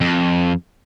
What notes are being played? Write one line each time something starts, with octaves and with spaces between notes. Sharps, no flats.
F2